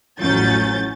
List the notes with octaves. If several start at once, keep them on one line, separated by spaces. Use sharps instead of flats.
A1 F2 F#3 C#4 G6 A6